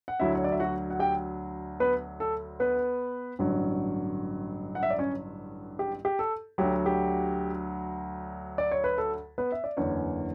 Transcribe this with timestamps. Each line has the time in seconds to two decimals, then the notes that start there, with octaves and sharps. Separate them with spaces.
0.08 F#5
0.20 D2 D3 F#3 E4 E5
0.35 C#5
0.44 D5
0.52 E5
0.60 F#4 F#5
0.90 F#5
0.99 G4 G5
1.80 B3 B4
2.20 A4
2.60 B3 B4
3.39 A1 G2 D3 F#3
4.75 F#5
4.83 E5
4.90 D5
4.99 C#4 C#5
5.79 G4
6.05 G4
6.19 A4
6.58 D2 D3 F#3 G4
6.86 G4
8.58 D5
8.71 C#5
8.84 B4
8.98 A4
9.38 B3 B4
9.52 E5
9.64 D5
9.77 F#1 E2 D3 C#4 C#5